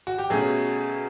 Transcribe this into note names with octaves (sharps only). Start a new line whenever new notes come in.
F#4
G4
B2 F#3 A3 C#4 G#4